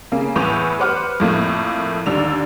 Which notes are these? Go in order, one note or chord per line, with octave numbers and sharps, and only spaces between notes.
C#3 A#3
E2 A2 B4 C#6 G6 F7
B4 C5 F#5 D6 F6 F#6
F2 A2 A3 A#3
D#2 D3 D5 E6 F7